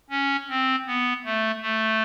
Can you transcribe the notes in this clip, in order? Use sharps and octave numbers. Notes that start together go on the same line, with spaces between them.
C#4
C4
B3
A3
A3